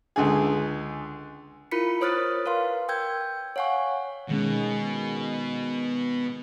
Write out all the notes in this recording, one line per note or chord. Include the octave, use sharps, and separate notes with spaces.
C#2 D3 G#4
E4 F4 A#4 B5 B6 C#7
C5 C#5 D#6 F6 F#6 A6
A#4 B4 F5 C6
G5 E6 G6 G#6
C#5 F5 F#5 G#5 C#6
B2 D#3 G#3 C#4